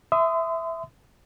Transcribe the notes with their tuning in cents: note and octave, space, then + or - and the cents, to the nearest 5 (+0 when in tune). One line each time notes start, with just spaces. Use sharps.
E5 +0 C6 -40 D#6 +0